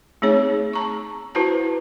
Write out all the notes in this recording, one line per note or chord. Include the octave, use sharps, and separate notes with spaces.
A3 C4 D#4 G#4 C#5
A5 A#5 C#6
E4 F#4 B4 C5 A5 A#5